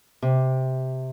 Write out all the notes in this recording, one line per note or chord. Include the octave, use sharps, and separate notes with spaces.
C3